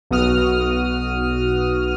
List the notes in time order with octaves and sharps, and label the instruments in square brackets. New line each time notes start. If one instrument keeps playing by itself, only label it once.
[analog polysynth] B1 B3 F#4 D#6 F6